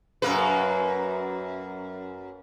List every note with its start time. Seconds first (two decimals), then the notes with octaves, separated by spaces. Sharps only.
0.22 F#2 A#3 B4